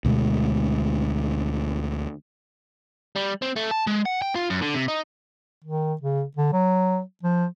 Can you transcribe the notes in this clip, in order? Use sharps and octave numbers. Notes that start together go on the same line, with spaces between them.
D2 B2 G#3
G3
C4
A3
A5
G#3
F#5
G5
F4
F#2
D3
C3
D#4
D#3
C#3
D3
F#3
F3